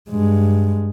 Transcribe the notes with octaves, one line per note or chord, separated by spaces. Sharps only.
G2 G#3